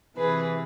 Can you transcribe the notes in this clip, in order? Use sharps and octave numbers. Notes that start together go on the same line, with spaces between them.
C3 E3 G#4 B4